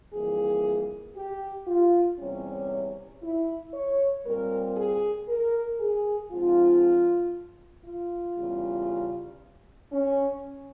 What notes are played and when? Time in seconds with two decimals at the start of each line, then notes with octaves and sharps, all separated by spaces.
0.14 F2 E3 G3 A#3 G#4
1.16 G4
1.67 F4
2.19 E2 C3 G3 C#4
3.23 E4
3.74 C#5
4.25 A#2 G3 C4 A#4
4.77 G#4
5.28 A#4
5.80 G#4
6.31 G#2 F3 C4 F4
7.85 F4
8.37 E2 C#3 G3
9.92 C#4